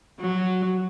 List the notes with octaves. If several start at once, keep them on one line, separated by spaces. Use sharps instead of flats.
F#3